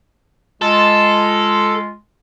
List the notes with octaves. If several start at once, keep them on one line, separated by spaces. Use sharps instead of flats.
G#3 F4 A4